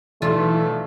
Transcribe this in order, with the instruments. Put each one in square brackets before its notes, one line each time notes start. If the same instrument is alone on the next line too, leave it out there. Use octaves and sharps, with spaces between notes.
[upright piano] B1 D5 E5 [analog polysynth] E3 [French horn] A3 [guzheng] F4